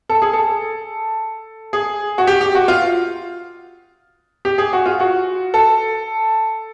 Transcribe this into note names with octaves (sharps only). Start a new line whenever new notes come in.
A4
G#4
A4
G#4
F#4
G4
G4
F#4
F4
G4
G#4
F#4
F4
F#4
A4